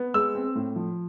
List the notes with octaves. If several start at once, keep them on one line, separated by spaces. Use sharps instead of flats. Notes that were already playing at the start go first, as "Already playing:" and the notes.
Already playing: B3
G#3 E6
C4
A2
F3